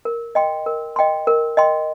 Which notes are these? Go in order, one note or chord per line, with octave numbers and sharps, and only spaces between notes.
A#4
D#5 G5 C6
A#4
D#5 G5 C6
A#4
D#5 G5 C6